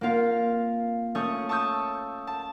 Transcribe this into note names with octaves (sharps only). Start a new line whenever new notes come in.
A#3 C4 F4 F5
A3 C#4 C#6 D#6 G6
A5 C#6 D#6 E6 G6
A5